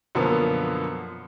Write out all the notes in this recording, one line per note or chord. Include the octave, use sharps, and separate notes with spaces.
F#2 B2 D3 F3 A#3 B3